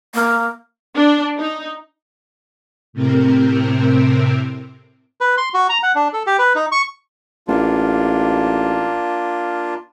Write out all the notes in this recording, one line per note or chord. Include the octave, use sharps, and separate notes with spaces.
A#3
D4
D#4
A2 C3 C4 A#4
B4
C6
F#4
A#5
F#5
D4
A4
G4
B4
D#4
C#6
A1 A#3 D4 F4